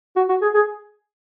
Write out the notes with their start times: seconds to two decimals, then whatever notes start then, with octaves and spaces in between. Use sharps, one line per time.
0.16 F#4
0.29 F#4
0.42 G#4
0.55 G#4